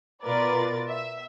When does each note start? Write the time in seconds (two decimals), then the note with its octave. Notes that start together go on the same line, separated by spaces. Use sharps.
0.23 B2 F4 A#4 B4 D5 A6
0.89 E5